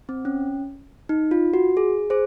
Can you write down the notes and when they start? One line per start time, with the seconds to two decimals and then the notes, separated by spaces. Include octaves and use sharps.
0.09 C4
0.25 C#4
1.09 D#4
1.31 F4
1.54 F#4
1.77 G#4
2.10 G#4 C5